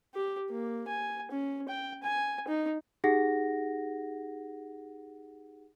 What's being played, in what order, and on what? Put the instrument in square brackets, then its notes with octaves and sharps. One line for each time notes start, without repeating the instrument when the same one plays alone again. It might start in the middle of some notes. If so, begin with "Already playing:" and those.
[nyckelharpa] G4
A#3
G#5
C#4
G5
G#5
D#4
[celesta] D#4 G4 G#4 F#5 A#6